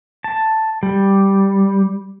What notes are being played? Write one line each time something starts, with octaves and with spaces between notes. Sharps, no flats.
A5
G3